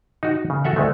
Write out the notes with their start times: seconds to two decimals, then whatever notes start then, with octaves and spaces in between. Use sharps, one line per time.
0.23 D#4 F#4
0.50 C#3
0.65 F#4 A4 E5 F#5
0.76 D2 G#3 A3